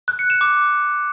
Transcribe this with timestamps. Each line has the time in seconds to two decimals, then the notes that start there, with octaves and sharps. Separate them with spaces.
0.08 F#6
0.19 C#7
0.30 E7
0.41 D6